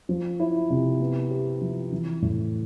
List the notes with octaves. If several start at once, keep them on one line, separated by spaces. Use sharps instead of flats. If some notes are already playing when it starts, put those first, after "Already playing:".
F3
E4
C3
B3
G4
F3
E3
A2